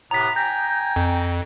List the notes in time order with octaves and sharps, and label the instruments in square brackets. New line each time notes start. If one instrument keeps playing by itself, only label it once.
[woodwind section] A2 C3 B3 [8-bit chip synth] A#5 B6
[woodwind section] G5 G#5 A#5 [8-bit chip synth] G6
[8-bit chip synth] F2